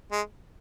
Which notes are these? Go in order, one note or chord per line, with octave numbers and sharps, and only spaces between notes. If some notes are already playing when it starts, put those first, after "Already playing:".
G#3